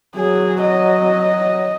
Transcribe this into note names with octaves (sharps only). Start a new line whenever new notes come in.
F#3 G#4
D#5